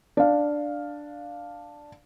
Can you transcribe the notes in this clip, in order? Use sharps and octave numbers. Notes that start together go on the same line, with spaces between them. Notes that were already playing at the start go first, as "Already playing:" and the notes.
D4 F5